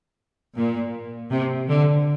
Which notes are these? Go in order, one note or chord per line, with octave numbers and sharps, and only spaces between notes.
A#2
C3
D3